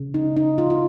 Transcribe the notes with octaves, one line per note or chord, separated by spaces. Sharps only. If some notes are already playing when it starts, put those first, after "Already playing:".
Already playing: C#3
D#4
D#4
F4
F4